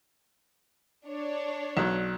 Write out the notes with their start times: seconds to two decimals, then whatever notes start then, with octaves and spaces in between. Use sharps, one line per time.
1.07 D4 C#5
1.77 B1 F#3